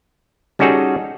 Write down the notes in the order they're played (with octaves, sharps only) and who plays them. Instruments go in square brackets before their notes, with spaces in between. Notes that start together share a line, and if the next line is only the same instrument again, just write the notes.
[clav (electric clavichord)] G3 C#4 D#4 F#4 G#4 A4